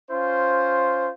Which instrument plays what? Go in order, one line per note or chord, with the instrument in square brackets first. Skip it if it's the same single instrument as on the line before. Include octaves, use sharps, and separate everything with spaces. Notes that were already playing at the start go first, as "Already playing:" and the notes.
[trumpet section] C#4 F4 C5